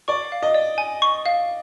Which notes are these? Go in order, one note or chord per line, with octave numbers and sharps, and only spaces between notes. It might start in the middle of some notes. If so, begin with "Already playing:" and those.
D5 C#6
F5
D#5
D5
G#5
C#6
F5